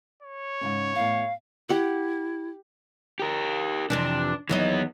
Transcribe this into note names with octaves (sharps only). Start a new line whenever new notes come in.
C#5
G#2 C#3 C#4
E2 A2 F5
E4 G4 F#5
G4 A#4
F2 C3 E3 D4
D#2 E3 F#3 B3 D#5